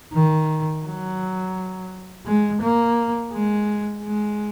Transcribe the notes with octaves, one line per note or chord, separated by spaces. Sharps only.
D#3
F#3
G#3
A#3
G#3
G#3